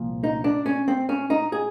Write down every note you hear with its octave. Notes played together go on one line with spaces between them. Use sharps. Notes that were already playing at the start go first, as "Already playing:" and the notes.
Already playing: C2 A#2 F3
D#4
D4
C#4
C4
C#4
D#4
G#4